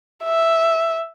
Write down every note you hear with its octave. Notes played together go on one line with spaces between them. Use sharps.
E5